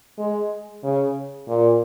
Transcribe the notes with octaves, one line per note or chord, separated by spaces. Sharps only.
G#3
C#3
A#2